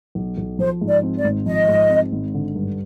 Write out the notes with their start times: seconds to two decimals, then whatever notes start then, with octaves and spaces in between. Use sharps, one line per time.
0.15 B1
0.38 B1
0.59 F3 C5
0.81 G#2
0.88 D5
1.03 C4
1.18 D5
1.24 G#1
1.46 F3 D#5
1.68 G#2
1.90 C4
2.12 G#1
2.34 D3
2.56 G2